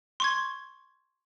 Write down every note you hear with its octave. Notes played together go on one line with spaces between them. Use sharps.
C6 C#6 G#6